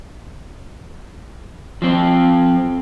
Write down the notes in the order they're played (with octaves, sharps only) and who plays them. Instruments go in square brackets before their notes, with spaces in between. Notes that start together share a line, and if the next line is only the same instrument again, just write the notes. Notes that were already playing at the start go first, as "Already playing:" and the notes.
[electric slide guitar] F3 C4